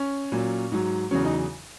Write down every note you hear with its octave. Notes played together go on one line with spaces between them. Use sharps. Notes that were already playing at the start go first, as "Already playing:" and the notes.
Already playing: C#4
A#2 F#3
G#2 F#3
E2 C#3 F#3 C#4
D#4